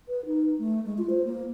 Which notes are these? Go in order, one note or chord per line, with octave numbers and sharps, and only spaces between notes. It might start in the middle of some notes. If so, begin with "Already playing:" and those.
B4
D#4
A3
G#3
F4
C5
A#3